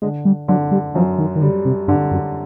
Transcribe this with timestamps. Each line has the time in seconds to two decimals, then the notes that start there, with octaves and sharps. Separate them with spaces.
0.02 D3 G#3
0.25 G3
0.48 D3 F#3
0.72 G3
0.95 F#2 F3
1.19 D#3
1.36 D#3
1.42 D3 G3
1.65 C3
1.88 G2 D3
2.11 F#2